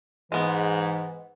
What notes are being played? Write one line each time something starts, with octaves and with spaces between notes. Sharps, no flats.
G#2 E3 G#3 B3